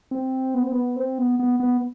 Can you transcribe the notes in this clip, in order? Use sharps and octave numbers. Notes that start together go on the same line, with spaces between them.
C4
B3
C4
B3
C4
B3
B3
B3